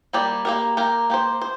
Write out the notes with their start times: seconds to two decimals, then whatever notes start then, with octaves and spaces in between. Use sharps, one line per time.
0.13 G3 A#3 G4 D5
0.45 A#3 G4 A#4
0.77 A#3 G4 A#4
1.10 A#3 G4 C5
1.42 C5